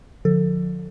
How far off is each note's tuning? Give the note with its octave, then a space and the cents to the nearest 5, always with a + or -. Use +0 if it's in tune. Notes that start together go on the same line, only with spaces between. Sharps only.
D3 +0 F3 +30 A4 +20